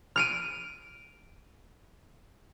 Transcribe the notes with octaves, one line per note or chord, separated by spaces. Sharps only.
F6 D7 D#7